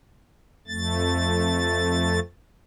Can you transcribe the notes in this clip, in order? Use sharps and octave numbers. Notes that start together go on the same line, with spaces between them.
F2 A3 A6